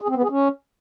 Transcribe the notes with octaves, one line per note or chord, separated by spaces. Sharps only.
G#4
C4
B3
G#4
C#4